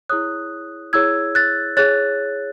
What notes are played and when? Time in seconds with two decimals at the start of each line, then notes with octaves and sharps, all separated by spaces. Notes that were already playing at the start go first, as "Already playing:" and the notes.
0.09 E4 G#4 C#5 D#6 F#6
0.93 E4 G#4 C#5 E6 G#6
1.35 F#6 A6
1.77 G#4 C#5 F#6 A6